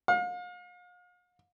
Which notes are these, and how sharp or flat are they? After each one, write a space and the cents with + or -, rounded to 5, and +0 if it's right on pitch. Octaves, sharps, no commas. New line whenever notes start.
F5 +40